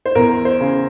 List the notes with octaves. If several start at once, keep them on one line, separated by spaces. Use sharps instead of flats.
C5
E2 A#4
C5
C#3